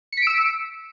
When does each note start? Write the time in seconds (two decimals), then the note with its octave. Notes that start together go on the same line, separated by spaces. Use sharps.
0.13 C#7
0.17 B6
0.22 D7
0.27 E6